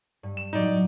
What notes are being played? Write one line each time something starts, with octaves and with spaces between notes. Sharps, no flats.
G2
E7
A2 F#3 D#4 D5